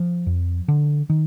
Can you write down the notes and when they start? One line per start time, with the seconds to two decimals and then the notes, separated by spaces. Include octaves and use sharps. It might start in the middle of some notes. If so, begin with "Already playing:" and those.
Already playing: F3
0.27 F2
0.68 D3
1.10 D#3